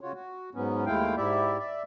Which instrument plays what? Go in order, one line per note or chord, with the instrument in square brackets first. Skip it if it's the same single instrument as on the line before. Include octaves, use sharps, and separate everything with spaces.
[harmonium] C#3 F4 F#4 C#5
F#4
G#2 F#3 B3 C#4
D#2 G#3 A3 E4 F5 G5
G#2 E4 G4 D5 E5
D5 E5